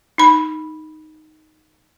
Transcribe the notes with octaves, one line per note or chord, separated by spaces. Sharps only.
D#4 B5